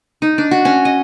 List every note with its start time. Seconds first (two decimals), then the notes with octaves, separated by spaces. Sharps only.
0.22 D#4
0.38 D4
0.51 F#4
0.65 C#4
0.85 D#5